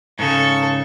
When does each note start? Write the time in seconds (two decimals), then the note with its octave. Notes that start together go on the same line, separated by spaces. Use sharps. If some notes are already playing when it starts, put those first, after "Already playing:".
0.19 G#2 C#3 A4 C#6